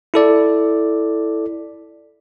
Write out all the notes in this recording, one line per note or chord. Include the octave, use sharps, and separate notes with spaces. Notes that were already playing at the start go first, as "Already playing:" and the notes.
E4 A4 D5